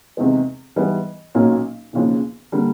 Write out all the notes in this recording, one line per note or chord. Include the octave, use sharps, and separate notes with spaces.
E2 C3 D#3 G#3 B3
G#2 E3 G3 B3
B1 A#2 F#3 A#3 C#4
E1 D#2 C#3 F3
D3 G3 A#3